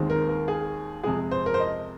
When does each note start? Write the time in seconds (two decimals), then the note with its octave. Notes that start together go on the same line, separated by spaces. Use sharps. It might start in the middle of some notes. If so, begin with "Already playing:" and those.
Already playing: D#2 D#3 G#3 C4
0.10 A#4
0.29 A#4
0.48 G#4
1.04 F2 C3 G#3 G#4
1.31 C5
1.46 A#4
1.54 C5
1.60 D#5